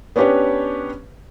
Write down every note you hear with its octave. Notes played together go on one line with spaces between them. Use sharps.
B3 C#4 D4 G4 B4 C#5